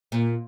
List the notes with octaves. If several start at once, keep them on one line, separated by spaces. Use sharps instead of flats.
A#2